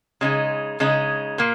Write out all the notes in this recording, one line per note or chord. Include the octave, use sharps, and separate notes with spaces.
C#3 G#3 D#4
C#3 G#3 D#4
A#2 A#3